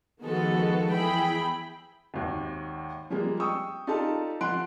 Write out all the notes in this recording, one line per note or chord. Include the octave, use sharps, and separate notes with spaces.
D#3 F3 G#3 B3 F#4 A4
E2 E4 G#4 G5 B5
G#1 D#2
F3 G3 G#3 A#3
G5 C#6 D#6 E6
D#4 F4 G4 A4 D5 A5
F3 F#5 C6 F#6 D7